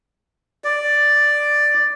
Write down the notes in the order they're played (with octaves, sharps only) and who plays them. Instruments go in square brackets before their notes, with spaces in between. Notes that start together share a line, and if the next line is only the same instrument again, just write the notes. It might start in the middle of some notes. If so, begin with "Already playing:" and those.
[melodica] D5